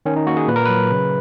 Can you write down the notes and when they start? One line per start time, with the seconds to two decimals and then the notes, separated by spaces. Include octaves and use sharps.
0.06 D#3 C#4
0.16 D#4
0.26 A#3 F#4
0.37 G#4
0.48 A#2 B4
0.56 A#4
0.66 F#3 B4
0.91 C#3